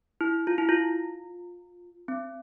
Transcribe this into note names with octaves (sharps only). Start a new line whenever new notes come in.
E4
F4
E4
F4
C4